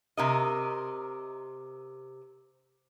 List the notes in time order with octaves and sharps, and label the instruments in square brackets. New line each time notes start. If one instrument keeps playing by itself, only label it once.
[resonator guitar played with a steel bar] C3 A#4 D#5